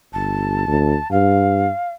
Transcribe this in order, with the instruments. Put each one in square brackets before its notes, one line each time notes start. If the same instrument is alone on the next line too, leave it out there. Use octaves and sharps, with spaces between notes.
[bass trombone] G1 [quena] A5
[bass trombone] D2
[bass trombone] G2 [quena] F5